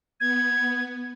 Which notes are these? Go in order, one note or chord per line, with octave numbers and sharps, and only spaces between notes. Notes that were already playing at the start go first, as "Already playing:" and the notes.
B3 G#6